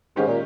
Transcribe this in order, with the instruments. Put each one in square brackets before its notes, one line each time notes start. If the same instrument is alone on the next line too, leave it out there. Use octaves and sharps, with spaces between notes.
[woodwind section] G#2 [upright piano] D#3 G#3 C#4 G4
[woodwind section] A#2